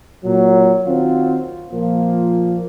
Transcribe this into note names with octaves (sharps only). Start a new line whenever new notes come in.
A#2 F#3
D#3 C4 F4 F#4
A#2 F3 A#3 F4